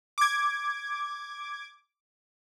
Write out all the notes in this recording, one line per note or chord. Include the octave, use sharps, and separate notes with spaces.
D6 G#6